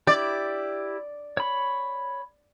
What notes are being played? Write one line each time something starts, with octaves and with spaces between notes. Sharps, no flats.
E4 G4 D5
C#5 B5